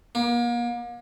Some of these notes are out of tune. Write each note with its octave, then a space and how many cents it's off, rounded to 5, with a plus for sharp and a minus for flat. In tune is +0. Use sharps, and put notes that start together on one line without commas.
A#3 +40